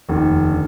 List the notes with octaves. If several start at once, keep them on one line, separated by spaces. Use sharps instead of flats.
F1 D#2 D#3
D3